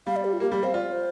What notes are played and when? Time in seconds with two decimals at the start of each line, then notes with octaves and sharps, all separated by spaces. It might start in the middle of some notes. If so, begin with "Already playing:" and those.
0.07 G3 F5
0.16 D5
0.25 G4
0.33 F4
0.40 A#3 G4
0.51 G3 G4
0.63 C4 F5
0.74 F4 D5
0.92 C5